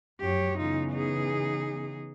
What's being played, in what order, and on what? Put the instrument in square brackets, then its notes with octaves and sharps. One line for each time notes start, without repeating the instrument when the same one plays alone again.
[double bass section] F#2 F#3 [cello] G4 C#5
[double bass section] C#3 E3 B3 [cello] D#4 F4
[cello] D#4 G#4